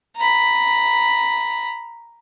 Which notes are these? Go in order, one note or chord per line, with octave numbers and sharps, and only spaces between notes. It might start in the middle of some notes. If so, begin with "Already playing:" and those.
A#5 B5